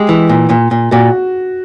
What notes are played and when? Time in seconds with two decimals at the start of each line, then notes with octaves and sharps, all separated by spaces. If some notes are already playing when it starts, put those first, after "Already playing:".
Already playing: G#3 G4 G#4
0.09 E3
0.29 A#2
0.50 A#2
0.71 A#2
0.91 A#2 F#4